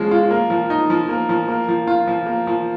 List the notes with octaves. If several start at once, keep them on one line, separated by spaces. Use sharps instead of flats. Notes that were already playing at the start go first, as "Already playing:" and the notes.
Already playing: F3 G#3 C#4
F4
A#3
F3
D#4
F3
A#3
F3
A#3
F3
F4
F3
A#3
F3